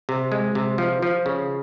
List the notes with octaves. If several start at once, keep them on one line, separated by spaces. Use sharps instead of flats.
C3
G#3
C3
F3
F3
C#3